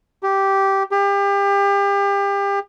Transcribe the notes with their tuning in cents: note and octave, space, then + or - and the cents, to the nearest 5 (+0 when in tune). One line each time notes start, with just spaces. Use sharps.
G4 -10
G4 +30